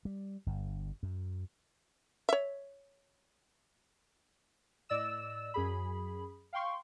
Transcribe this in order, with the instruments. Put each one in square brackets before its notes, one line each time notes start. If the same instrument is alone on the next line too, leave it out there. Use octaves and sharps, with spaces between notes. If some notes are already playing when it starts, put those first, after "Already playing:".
[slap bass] G3
G1 G2
F#2
[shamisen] C#5 E5
[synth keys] A2 D5 D#5 E6 E7
F#2 G#4 B5
F5 G5 C6 C#6